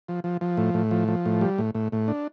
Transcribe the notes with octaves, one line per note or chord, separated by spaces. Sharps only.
F3
F3
F3
A2
A2
F3
F3
A2
G3
A2
A2
A2
D4